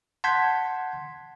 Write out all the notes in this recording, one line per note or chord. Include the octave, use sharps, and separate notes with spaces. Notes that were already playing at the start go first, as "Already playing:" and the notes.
F#5 A5 C6 G6 G#6 B6